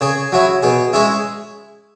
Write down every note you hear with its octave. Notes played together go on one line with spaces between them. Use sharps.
C#3 G#4
F#3 C#4 E4
B2 G#4
G#3 C#4 E4 G#4